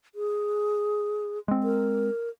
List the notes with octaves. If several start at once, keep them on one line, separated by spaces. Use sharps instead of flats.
G#4
G#3 C4
A#4